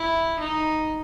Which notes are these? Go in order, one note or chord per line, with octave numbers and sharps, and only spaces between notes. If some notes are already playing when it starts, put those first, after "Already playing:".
Already playing: E4
D#4